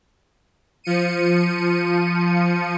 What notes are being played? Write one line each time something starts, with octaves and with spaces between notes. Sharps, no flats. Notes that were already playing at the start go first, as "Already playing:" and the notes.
F3 C#7 D#7